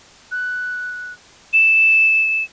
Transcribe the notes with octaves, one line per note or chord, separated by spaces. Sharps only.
F#6
E7